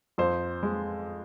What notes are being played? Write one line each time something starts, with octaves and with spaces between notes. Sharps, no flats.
F2 C5
G#3